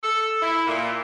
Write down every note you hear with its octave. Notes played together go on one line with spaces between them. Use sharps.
A4
E4
A#2